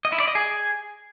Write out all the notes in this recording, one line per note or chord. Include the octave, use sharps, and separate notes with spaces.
D#5
E4
D5
D#5
G#4